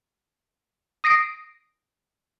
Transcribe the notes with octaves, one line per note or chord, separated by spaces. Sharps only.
D#6 A#6 C7 D7